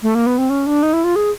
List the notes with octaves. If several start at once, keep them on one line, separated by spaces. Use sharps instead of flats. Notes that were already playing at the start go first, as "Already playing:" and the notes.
A3
A#3
B3
C4
C#4
D4
D#4
E4
F4
G#4